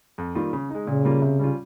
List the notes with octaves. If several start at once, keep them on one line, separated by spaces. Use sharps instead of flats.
F2
D#3 G3 A#3 F4
C#3
G#3 D#4
A#2 C#3
G3 A#3 F4
C3
G3 C#4 F4